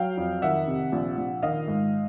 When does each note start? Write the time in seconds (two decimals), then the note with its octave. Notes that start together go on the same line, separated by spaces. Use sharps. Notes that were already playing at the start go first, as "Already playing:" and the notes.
Already playing: F#3 F5 G5
0.17 F2
0.42 D#3 E5 F#5
0.67 C3
0.92 A#1
1.17 A#1
1.43 D#3 D#5 F5
1.68 G#2